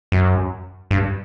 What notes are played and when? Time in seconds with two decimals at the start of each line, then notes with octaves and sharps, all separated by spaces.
0.12 F#2
0.91 G2